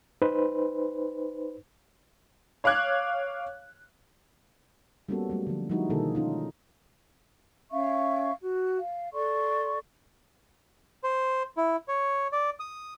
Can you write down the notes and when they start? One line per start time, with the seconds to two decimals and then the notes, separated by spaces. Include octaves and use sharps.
0.22 D#4 B4 C5
2.64 C#5 F5 D6 F#6 G#6
5.09 G3 A#3 B3 C#4 F#4 A4
5.30 F#3 G3 A3
5.47 D3 F3
5.69 F3 G3 G#3 D#4 E4 F#4
5.90 B2 D3 D#3 A#3 G#4 A4
6.15 C#4 D#4 F4
7.72 C#4 E5 F5 C#6
8.41 F#4
8.78 F5
9.13 A4 D5 C6 C#6
11.04 C5
11.57 E4
11.88 C#5
12.33 D5
12.60 D#6